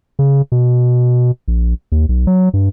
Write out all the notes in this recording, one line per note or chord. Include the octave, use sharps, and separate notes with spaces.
C#3
B2
A#1
D#2
B1
F#3
G2